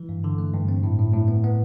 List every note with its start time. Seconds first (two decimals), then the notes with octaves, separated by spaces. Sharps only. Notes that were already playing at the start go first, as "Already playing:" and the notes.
Already playing: E3
0.09 G2
0.24 D3
0.38 A3
0.54 G2
0.69 C4
0.83 A2
0.98 A2
1.14 A2
1.28 B3
1.44 B3